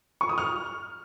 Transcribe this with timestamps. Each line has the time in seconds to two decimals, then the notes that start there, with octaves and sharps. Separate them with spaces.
0.21 C#6
0.29 D#6
0.38 F6